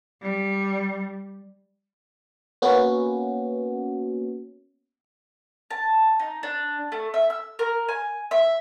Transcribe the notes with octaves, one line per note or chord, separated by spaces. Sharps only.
G3
A#3 B3 C#4 F#4
A5
D#4
D4
A3
E5
E6
A#4
G#5
E5